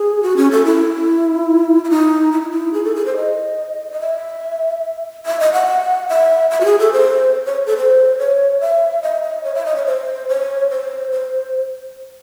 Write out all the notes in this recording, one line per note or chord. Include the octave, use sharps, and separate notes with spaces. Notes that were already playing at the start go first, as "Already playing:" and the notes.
Already playing: G#4
F#4
C#4
A4
E4
E4
D#4
E4
D#4
E4
G#4
A4
G#4
C5
D#5
D#5
E5
E5
D#5
F#5
E5
E5
F#4
G#4
A4
C5
C#5
A4
C5
C#5
E5
D#5
D#5
C#5
E5
D#5
C#5
C5
C#5
C5
C5